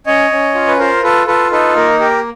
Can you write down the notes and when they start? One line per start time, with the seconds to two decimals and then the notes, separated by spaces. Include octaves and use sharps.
0.06 C#4 C#5 D#5
0.31 C#4
0.55 F4
0.68 B4
0.79 F4 A#4 C5
1.03 F4 A4 B4
1.27 F4 A4 B4
1.51 D#4 A4 B4
1.76 A#3 A#4
2.00 G4 A#4